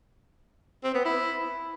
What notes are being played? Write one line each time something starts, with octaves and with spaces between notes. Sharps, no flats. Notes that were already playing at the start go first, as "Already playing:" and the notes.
C4
B3
E4